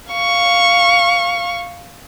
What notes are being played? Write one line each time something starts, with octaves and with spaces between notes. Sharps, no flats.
F5 C#6